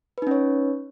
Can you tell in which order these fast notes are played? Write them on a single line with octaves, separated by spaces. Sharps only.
B4 D#4 C#4 C#5